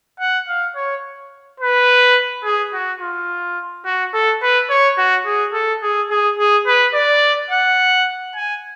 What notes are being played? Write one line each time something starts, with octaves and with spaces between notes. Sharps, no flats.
F#5
F5
C#5
B4
G#4
F#4
F4
F#4
A4
B4
C#5
F#4
G#4
A4
G#4
G#4
G#4
B4
D5
F#5
G#5